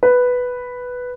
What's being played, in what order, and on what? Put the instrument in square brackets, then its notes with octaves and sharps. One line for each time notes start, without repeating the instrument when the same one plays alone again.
[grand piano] B4